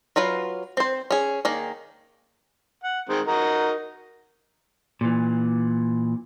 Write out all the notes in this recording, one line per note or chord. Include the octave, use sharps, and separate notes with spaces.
F#3 F4 B4 F5
C4 C5
C#4 G#4
D#3 A#3 G#4
F#5
D#3 G#3 C4
D#4 F#4 A#4
A#2 E3